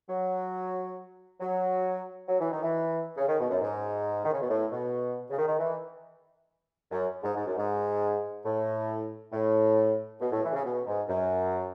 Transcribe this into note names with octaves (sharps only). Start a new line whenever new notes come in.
F#3
F#3
F#3
E3
D#3
E3
C#3
D#3
B2
F#2
G#2
D#3
C#3
B2
A2
B2
C#3
D#3
D#3
E3
F#2
G#2
G#2
F#2
G#2
A2
A2
B2
A2
E3
C#3
B2
G#2
F#2